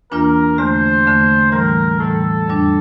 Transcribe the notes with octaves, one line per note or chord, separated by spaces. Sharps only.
E2 E3 A#3 D4 F4 A#4
E2 D3 A3 C5
E2 D3 A3
A2 E3 G3 A#4
A2 E3 G3 A4
F2 D3 G3 D4